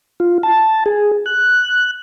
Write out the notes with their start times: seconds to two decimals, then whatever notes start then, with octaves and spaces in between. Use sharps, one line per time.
0.20 F4
0.43 A5
0.86 G#4
1.26 F#6